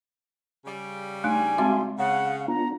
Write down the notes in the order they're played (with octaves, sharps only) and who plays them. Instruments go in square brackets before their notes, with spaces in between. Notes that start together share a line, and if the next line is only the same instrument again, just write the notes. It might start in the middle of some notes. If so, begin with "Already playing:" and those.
[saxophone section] C#3 G3
[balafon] A3 D4 D#4 [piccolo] G#5
[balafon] G#3 C4 D6 [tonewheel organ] F#4 E5 C6
[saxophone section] C#3 [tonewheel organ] F5 [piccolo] F#5
[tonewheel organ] B3 D4 F4 [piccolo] A#5